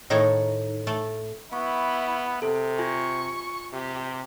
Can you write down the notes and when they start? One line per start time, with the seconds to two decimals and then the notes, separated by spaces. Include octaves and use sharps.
0.10 A2 D#3 D#4 A4 C#5
0.87 A3 A4
1.53 B3 E4 C#6
2.42 C3 A4
2.78 F4 G#5 C#6
3.73 C3 G4